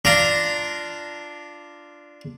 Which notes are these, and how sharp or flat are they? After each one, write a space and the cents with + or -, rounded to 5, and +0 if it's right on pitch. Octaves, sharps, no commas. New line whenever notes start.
D4 +0 F4 -15 A#5 +0